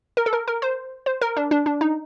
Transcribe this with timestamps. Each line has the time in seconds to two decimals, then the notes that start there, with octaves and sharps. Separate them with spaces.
0.17 A#4
0.26 A4
0.33 A#4
0.48 A#4
0.62 C5
1.06 C5
1.21 A#4
1.37 D4
1.51 D4
1.66 D4
1.81 D#4